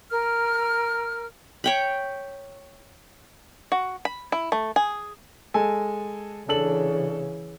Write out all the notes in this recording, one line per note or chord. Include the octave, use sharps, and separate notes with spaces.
A#4 F6
C#5 G5 B5
F#4
B5
E4
A3
G#4
G#3 A4 G#5
C#3 E3 D4 A4 F#7